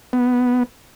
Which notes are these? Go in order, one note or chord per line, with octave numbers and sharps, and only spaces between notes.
B3